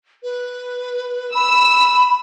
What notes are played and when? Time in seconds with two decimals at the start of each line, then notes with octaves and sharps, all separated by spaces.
0.23 B4
1.34 B5 E6